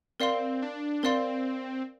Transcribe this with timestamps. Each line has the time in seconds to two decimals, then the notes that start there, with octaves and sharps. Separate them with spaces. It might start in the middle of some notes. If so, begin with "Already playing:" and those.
0.20 C4 A#4 D5 F5 C6
0.62 D4
1.03 C4 A#4 D5 F5 C6